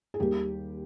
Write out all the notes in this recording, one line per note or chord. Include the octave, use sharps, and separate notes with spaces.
G#4
D#2 D#3 G3 A#3 G4